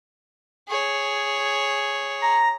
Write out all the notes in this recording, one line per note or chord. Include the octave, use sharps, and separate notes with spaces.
G#4 C#5
A#5